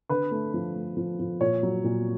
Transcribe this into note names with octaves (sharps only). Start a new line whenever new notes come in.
D3 B4
A3
F3
A3
F3
F3
A#2 C#5
F#3
A#2